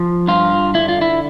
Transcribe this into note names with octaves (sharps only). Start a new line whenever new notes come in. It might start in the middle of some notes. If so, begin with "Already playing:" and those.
Already playing: F3
G2 F4
D3 E4
F4
E4